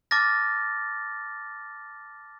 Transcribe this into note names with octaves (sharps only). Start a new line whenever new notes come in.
A5 D6 F6 A6 A#6